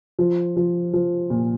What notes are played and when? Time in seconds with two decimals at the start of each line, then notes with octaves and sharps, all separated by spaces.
0.19 F3
0.56 F3
0.93 F3
1.30 A#2